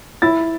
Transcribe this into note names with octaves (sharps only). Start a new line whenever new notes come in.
E4 A6